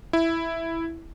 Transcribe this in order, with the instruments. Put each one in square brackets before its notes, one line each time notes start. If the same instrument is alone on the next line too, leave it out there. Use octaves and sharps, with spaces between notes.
[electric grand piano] E4